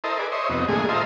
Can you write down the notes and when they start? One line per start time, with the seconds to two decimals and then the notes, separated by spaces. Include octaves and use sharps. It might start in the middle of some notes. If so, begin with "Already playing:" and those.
0.04 E4 A4 A#4 C5 D#5
0.19 G#4 B4 D5
0.32 C5 C#5 D#5 E5
0.49 F2 C3 B3 D#4
0.68 A2 D3 G#3 A#3 G#4
0.89 F4 A4 A#4 C5 D#5 E5